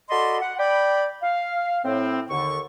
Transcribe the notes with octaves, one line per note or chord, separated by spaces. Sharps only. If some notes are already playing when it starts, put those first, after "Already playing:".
F#4 A4 D5 D#5 B5 C6
F#5
D5 G5 B5
F5
A2 C4
D#2 D3 C#6